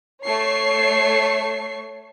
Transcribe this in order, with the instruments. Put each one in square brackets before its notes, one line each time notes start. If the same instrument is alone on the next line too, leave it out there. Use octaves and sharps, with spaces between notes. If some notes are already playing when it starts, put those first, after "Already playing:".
[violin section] A3 C#5 C#6 C7